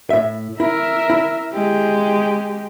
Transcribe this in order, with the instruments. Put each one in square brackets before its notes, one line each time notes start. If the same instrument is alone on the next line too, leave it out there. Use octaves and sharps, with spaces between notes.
[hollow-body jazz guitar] A2 E5
[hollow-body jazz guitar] E4 [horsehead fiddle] A#4 E5
[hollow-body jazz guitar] E4
[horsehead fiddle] G#3 G4